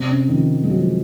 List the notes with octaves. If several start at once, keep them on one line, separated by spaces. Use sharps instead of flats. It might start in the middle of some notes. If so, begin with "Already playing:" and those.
Already playing: C3
C#3
D#3
F3
G#3
F#3
F3